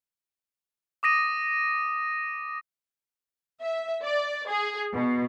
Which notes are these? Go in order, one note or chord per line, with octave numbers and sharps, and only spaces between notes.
D6 D#6 A#6 D#7
E5
D5
G#4
B2